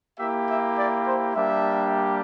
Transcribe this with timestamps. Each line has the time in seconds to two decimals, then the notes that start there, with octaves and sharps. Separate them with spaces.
0.19 A#3 E4 G4 E5
0.49 E5
0.78 D5
1.06 C5
1.35 G3 A#3 D4 G4 E5